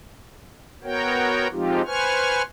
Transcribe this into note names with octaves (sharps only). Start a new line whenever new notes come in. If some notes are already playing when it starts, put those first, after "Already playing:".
B3 F#4 A#4 C#5 G5
F3 G#3 C4 D#4 F4 G4
B4 C5 G#5 C#6 F6